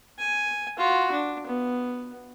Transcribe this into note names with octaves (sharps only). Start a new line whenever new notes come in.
G#5
F4 F#4
D4
B3